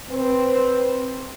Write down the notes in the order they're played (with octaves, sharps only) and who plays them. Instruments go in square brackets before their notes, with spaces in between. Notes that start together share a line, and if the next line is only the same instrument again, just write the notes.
[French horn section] C4 B4